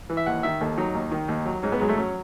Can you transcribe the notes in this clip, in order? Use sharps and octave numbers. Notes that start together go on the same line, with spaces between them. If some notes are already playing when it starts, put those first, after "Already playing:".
E3
E5
D#2 F#5
D#3 E5
D#2 A4
F#3 D#4
D#2
D#3
D#2
F#3
G#2 C#4
B3
F#3 G#3
A3
F#3 C#4